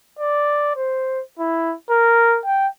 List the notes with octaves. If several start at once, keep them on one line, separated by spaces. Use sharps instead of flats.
D5
C5
E4
A#4
G5